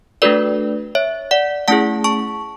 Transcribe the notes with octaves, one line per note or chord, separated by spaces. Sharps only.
A3 D4 F#4 A4 B4 D5
C#5 E5
D5 F#5
A3 C#4 E4 G#4 F#5 A5
A5 C#6